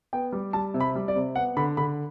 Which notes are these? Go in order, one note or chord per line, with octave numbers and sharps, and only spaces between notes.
B3 G5
G3
G3 A5
C3
B5
G3
D5
C3
B3 F#5
D3 B5
D3 B5